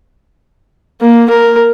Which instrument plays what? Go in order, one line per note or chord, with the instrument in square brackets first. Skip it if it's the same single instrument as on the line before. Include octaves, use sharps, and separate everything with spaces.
[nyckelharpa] A#3
A#4